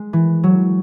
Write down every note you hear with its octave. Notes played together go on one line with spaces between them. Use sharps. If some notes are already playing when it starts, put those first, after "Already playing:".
Already playing: G#3
E3
F#3